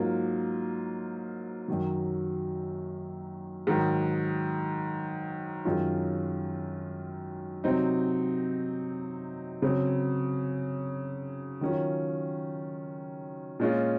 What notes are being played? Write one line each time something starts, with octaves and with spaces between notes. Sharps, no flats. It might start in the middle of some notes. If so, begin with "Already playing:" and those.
Already playing: G#2 F#3 A#3 F4
F#2 D#3 F#3
G#2 D#3 F#3
F#2 D#3 G#3 C#4 F4
C3 F#3 C4 D#4
C#3 F#3 C4
D#3 F#3 C#4 F4
A#2 G#3 C#4 F4